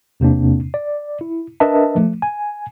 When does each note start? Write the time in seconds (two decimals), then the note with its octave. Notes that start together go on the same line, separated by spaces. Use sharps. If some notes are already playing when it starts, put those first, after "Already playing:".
0.20 E2 C3 A#3 C4 D4
0.74 D5
1.21 E4
1.60 D4 A#4 B4 D#5 E5 A5
1.95 F3 A3
2.22 G#5